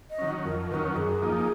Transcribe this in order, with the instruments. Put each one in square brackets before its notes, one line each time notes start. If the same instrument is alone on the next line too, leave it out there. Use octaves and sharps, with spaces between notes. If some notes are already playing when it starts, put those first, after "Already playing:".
[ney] D#5
[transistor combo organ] D#3 F#3 C#4
[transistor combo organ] F2 [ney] A#4
[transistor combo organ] D#3 F#3 C#4 [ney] A#4 B4
[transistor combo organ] F#2 [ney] G#4
[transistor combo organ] F3 A#3 D#4